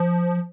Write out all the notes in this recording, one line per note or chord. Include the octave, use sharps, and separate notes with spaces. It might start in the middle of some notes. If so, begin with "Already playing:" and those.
Already playing: F3